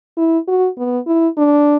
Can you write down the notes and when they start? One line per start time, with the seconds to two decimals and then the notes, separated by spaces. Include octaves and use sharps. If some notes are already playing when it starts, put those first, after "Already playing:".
0.17 E4
0.48 F#4
0.78 B3
1.07 E4
1.38 D4